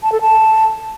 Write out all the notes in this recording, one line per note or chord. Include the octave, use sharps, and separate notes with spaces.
A5
A4
A5